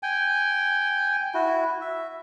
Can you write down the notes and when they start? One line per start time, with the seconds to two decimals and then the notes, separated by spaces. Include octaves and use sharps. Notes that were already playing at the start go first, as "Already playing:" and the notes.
0.03 G5 G#5
1.34 E4 F#4
1.81 E5